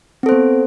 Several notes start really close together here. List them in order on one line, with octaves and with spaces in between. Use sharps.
C4 A4 C5 B3